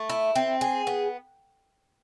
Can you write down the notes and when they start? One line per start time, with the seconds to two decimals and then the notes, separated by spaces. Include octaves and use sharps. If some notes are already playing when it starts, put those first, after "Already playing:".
Already playing: A3
0.09 E4
0.35 C4
0.61 G#4
0.87 B3